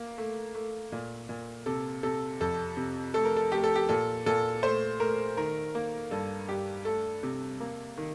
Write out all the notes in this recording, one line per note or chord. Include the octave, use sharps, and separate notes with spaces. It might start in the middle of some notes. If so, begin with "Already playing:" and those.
Already playing: A#3
A3
A3
A#2
A#2
C3 A4
C3 A4
F2 A4
C3
A3 A4
A#4
A4
A3 G4
A4
G4
A#2 A4
A#2 A4
A3 C5
A3 A#4
D#3 A#4
A#3
G2 A4
G2 G4
A3 A4
C3
A#3
D#3